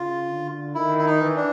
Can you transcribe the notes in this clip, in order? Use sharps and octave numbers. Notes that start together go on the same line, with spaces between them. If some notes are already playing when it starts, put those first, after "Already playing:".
Already playing: C#3 F4
D3
D#3 E4
E4
D#4
E3
D4